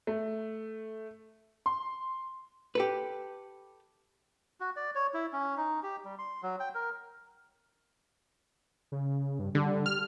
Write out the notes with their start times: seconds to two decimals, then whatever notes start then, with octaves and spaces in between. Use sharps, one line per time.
0.07 A3
1.66 C6
2.75 G4 A4 B4
4.60 F#4
4.76 D5
4.95 C#5
5.14 E4
5.33 C#4
5.57 D#4
5.83 G4
6.04 G3
6.19 C6
6.43 F#3
6.60 G5
6.75 A#4
8.92 C#3
9.39 G2
9.55 D3 G3
9.86 F6